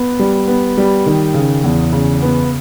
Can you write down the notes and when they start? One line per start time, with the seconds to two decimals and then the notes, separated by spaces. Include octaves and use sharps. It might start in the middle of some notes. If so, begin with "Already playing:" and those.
Already playing: B3
0.19 G3
0.48 B3
0.78 G3
1.06 D#3
1.34 C#3
1.64 E2
1.92 C#3
2.22 B3